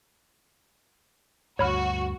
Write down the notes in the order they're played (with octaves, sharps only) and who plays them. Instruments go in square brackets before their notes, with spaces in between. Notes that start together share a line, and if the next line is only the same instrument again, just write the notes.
[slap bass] D2 G2 [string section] F#4 [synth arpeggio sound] C#5 B5 F6